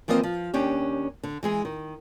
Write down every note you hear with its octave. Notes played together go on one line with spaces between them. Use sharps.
E3 F3 A#3 C4 D#5
F3
D#2 C#4 D4 G4
D3
E3 G#3 G#4
D#3